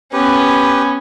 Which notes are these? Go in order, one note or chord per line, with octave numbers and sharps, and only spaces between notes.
B3 C#4 G4 B4